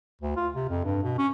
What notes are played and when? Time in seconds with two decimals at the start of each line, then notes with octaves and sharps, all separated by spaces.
0.22 D2
0.37 F4
0.54 C3
0.69 F2
0.84 G2
1.03 B2
1.18 C#4